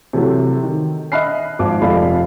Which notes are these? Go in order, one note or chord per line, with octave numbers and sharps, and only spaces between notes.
C3 E3 F#3 A3
D#3
D#5 E5 B5 F6 F#6 C7
G#1 F3 D6
F1 F3 A4 D5 F5 B5